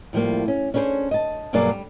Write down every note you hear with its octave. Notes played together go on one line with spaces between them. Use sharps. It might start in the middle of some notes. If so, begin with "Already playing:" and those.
A2 F3 G3 A#3
C#4
C#4 D4 G#4 B4 C5
D#5 A5
G2 B2 F#3 A#3 G#4 D5
G3